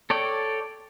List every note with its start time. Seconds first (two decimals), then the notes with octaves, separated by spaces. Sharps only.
0.10 A4 C#5 D5 G5